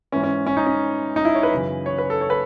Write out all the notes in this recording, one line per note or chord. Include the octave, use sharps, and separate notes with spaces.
G#2 E3 C#4
C#4
C#4
D#4
C#4
D#4
E4
C#5
B4
F#2 C#3 E3
C#5
B4
A4
C#5
B4